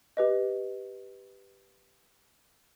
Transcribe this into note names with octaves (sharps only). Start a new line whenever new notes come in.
G4 B4 D#5